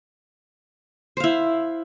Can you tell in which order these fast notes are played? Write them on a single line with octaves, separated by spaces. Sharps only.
C5 F5 E4